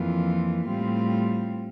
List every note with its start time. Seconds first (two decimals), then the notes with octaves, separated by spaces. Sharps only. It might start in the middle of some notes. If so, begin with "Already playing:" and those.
Already playing: F2 E3 A#3 F4
0.68 A2 G3 C4 F4